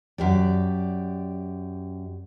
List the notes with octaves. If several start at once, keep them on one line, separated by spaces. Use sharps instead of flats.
F#2 G4 D5